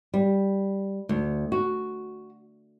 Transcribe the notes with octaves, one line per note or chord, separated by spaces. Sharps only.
G3
D2
F#4